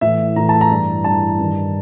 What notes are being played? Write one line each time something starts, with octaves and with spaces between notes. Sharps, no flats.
A2 E3 E5
A2 E3 A#5
A5
A#5
G2 E3
G2 E3 A5
G2 D#3